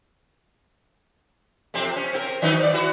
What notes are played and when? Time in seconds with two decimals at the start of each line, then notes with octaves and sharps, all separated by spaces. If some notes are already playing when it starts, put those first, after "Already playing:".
1.74 F2 C3 C4
1.96 C#4
2.13 C4 F#4 A#4
2.42 D#3 F#3 D#4
2.60 C5 D5
2.73 E4 F#4